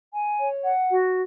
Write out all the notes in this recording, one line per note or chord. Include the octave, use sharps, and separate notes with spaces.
G#5
C#5
F#5
F#4